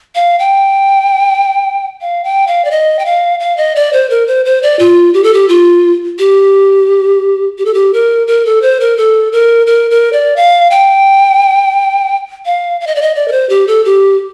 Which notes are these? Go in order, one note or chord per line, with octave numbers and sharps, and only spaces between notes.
F5
G5
F5
G5
F5
D5
D#5
G5
F5
F5
D#5
D5
C5
A#4
C5
C5
D5
F4
G4
A4
G4
F4
G4
G4
A4
G4
A#4
A#4
A4
C5
A#4
A4
A#4
A#4
A#4
D5
F5
G5
F5
F5
D#5
D5
D#5
D5
A#4
C5
G4
A4
G4